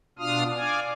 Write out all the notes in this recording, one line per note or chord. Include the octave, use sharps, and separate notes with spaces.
B2 D4 F4 F5 D#6 F6
D5 F5 G#5